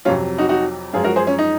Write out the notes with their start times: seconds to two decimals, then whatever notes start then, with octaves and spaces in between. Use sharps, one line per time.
0.05 F2 C3 F#3 C#4 F4
0.38 D#4 F#4
0.49 D#4 F#4
0.93 F#2 F3 G#3 F4 G#4
1.04 F#4 A#4
1.16 G#4 C5
1.27 C#4
1.38 D#4